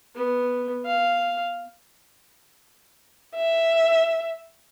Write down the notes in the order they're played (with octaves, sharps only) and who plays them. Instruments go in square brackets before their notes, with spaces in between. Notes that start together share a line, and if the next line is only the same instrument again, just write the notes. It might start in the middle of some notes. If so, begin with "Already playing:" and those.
[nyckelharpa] B3
F5
[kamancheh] E5